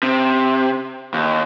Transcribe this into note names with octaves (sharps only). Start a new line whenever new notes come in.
C3
D#2